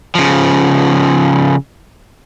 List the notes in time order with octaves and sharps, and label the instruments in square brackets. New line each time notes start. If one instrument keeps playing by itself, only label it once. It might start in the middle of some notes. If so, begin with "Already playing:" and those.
[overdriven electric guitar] C#3 F3